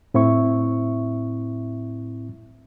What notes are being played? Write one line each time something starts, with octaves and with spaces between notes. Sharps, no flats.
A2 C4 E4 E5 C#6